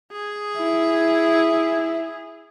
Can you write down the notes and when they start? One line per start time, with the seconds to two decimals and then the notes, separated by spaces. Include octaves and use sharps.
0.12 G#4
0.57 E4